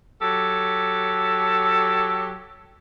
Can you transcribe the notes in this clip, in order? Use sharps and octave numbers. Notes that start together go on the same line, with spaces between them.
F#3 G4 A4